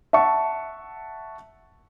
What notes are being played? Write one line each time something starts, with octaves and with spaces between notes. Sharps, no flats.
E5 F#5 A5 C#6